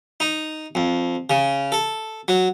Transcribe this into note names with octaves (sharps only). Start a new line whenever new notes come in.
D#4
F2
C#3
A4
F#3